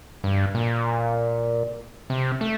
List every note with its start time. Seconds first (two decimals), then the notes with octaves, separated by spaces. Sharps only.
0.24 G2
0.55 A#2
2.10 C3
2.41 A3